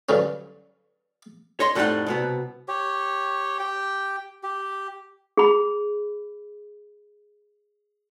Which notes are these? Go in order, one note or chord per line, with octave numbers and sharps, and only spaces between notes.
G2 D3 F#3 C#4
C#5 D#5 C6
F2 A2 G3 A3 D#4 F#5
C2 B2 B3
G4 C#5
G4 G5
G4
G#4 B5